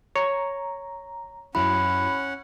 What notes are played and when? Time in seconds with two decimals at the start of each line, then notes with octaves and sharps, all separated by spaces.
0.16 C#5 A#5
1.55 F#2 F#3 C#4 E4 F#5 B5